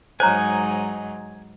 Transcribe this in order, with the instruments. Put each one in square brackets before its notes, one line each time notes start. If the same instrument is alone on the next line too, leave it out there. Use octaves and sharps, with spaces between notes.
[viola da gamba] G#2 F#3 D#4 [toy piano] C5 C#5 A#5 [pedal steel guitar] G#5